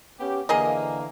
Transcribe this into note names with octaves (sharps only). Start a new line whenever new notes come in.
B3 C#4 G4
D3 E3 A#3 G#4 A#4 D#5